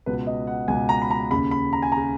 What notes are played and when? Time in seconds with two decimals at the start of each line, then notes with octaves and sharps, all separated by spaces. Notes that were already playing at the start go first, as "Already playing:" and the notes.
0.06 C#2 B2 B4
0.27 D#5
0.47 F#5
0.68 C#2 B2 G#5
0.89 A#5
1.02 B5
1.11 A#5
1.31 D#2 C#3 B5
1.51 B5
1.73 A#5
1.82 G#5
1.92 C#3 A#5